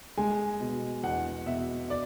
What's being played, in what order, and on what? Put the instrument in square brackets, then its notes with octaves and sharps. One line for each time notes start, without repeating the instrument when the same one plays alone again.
[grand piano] G#3 G#5
B2
E2 F#5
B2 E5
D5